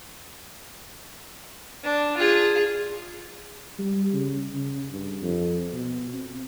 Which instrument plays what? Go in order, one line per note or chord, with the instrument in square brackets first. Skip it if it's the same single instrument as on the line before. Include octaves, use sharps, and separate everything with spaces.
[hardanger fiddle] D4
F4 G#4
[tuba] G3
C#3
C#3
G2
F2
B2
C4